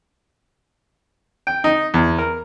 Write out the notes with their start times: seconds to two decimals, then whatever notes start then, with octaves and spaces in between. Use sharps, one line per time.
1.47 G5
1.64 D#4
1.94 E2
2.19 A#4